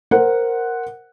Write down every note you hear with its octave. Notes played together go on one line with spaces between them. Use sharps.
A#4 C5 F#5